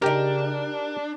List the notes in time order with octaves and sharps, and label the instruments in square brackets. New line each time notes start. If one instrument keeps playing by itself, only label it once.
[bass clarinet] C#3 [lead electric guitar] D4 [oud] D#4 G4 [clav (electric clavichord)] A#4 G5